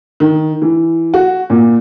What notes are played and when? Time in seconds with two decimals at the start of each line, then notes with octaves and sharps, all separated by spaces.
0.20 D#3
0.62 E3
1.14 F#4
1.50 A#2